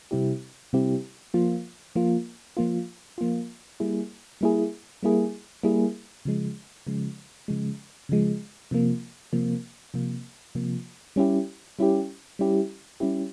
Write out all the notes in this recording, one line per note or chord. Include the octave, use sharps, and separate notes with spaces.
C3 G3 C4 E4 G4
C3 G3 C4 E4 G4
F3 A#3 F4
F3 A#3 F4
F3 A#3 F4
F3 A#3 F4
G3 A#3 E4 G#4
G3 A#3 E4 G#4
G3 A#3 E4 G#4
G3 A#3 E4 G#4
C#3 F3 G#3
C#3 F3 G#3
C#3 F3 G#3
C#3 F3 G#3
C3 F3 A#3
C3 F3 A#3
C3 F3 A#3
C3 F3 A#3
G3 C#4 E4 G4
G3 C#4 E4 G4
G3 C#4 E4 G4
G3 C#4 E4 G4